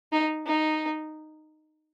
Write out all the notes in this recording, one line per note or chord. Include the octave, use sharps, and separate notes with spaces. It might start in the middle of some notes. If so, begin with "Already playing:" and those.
D#4
D#4